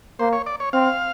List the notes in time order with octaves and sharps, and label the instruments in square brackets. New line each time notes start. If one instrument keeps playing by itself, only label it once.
[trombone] A#3 [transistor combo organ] C5
[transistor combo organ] C#5
D5
C#5
[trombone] C4 [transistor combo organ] F5